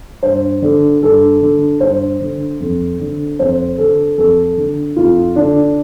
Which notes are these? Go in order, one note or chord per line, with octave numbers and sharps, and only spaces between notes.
G2 C5
D3
G2 A4
D3
G2 C5
D3
F2
D3
F2 C5
D3 A4
F2 A4
D3
F2 F4
D3 D4